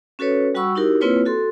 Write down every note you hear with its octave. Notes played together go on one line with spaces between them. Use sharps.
C#4 F#4 A4 B4 C#5
G3 F#4 F#5 B5 C#6 E6
D#4 E4 F#4 G4 A#4
A#3 C4 E4 F4 B4 C#5
F#4 A4 C6